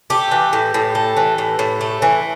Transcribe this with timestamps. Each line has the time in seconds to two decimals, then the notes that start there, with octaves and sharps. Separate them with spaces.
0.10 A3 G4
0.31 E3
0.53 A2
0.74 A2
0.95 A3
1.17 E3
1.38 A2
1.59 A2
1.81 A3
2.02 E3